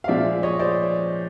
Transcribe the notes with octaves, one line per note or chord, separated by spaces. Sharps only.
F5
A#2 F3 G#3 D5 E5
C#5 D#5
C5 D5